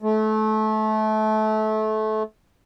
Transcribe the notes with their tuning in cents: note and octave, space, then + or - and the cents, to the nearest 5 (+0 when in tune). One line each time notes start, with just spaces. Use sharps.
A3 -25